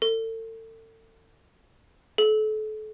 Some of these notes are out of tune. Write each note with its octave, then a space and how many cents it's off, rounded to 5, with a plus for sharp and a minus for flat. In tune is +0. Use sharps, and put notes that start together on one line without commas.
A4 +35
A4 -35